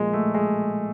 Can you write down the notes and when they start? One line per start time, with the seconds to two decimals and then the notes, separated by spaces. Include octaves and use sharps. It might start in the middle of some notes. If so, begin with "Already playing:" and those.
Already playing: A#2 F3 G#3
0.13 A3
0.34 G#3